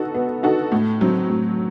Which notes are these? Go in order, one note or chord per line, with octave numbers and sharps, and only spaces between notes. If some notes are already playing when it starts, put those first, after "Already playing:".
Already playing: B3 D#4 F#4 A4
B3
D#4 F#4 A4
A2
F#3 C4
A2